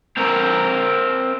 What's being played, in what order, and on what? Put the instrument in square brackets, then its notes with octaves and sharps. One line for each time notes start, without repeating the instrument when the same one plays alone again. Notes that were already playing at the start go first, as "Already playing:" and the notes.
[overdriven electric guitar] C4 A#4